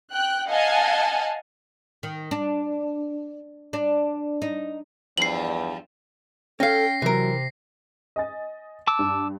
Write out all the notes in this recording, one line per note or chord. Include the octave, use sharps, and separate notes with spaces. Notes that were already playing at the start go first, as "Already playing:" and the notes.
G5 F#6
D#5 F5 F#5 G#5 A5
D#3
D4
D4
D#4
E2 G2 F3 C7 F#7
C#4 A4 F5 G5 A#6 C7
C3 E3 F#3 A#4
D#5 G#5 A6
A5 D6 E6
G2